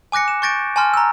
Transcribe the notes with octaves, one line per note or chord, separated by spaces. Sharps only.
G#5 D6 F#6 A#6 C#7
E7
C#6 G6 A6 A#6 D7
G#5 A5 C6 F6
A#5 E6